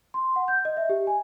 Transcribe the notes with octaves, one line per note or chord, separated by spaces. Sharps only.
C6
F#5
G6
D#5
E5
G4
G#5